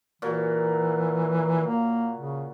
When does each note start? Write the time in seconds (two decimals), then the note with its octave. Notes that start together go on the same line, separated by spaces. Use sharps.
0.22 A#2 E3 F#3
1.67 A#3
2.18 C#3